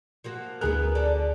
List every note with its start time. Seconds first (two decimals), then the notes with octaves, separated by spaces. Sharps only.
0.24 F3 A#3 F#4
0.61 D2 B3 E4 G#4 A#4 F#6
0.95 D3 A4 D5